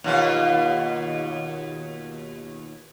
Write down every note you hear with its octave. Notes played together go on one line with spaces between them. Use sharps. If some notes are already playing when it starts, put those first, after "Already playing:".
D#2 B2 F4